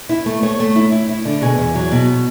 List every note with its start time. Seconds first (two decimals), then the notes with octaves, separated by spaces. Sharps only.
0.09 E4
0.26 A3
0.43 A3 C#5
0.60 A3
0.76 E4
0.92 E4
1.09 E4
1.25 D3
1.42 B2 G#4
1.58 E2
1.75 F#3
1.91 B2